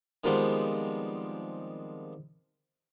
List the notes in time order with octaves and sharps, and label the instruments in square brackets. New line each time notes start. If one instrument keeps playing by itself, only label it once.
[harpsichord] D#3 F3 G3 G#3 B3 C4